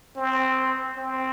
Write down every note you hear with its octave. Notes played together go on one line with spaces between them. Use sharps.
C4
C4